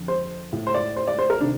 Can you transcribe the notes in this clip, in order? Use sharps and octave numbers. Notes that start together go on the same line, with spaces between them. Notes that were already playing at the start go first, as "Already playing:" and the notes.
Already playing: F2 D3
C5
A2
C5
D5
C5
D5
C5
A#4
C3 D#3 D4